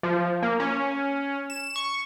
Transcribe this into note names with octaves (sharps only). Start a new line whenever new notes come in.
F3
A#3
C#4
E7
C#6